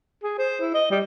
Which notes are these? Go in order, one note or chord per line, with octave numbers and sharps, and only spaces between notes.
G#4
C5
E4
D#5
G3